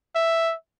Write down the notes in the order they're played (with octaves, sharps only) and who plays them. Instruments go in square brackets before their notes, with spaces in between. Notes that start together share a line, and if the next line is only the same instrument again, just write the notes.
[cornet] E5